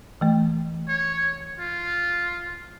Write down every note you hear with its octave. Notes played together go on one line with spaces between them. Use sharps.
E3 A3
C#5
F4